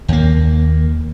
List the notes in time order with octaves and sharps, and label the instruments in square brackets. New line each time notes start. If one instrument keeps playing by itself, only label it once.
[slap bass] D#2 A#3